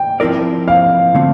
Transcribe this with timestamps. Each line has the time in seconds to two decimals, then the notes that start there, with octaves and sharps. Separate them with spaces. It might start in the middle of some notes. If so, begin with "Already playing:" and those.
Already playing: G5
0.20 F3 C4 E4 A#4 D5
0.68 F5
1.15 D3 A3 C4